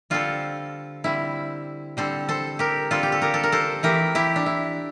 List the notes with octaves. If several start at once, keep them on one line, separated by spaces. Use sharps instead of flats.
D3 G3 C4 F4 A4
D3 G3 C4 E4
D3 G3 C4 A4 C5
A4 C5
G4 A#4
D3 G3 C4 F4 A4
G4
A4
G4 A#4
A4
A#4
A4 C5
E3 A3 C4 G4 A#4
E4 G4
D4
E4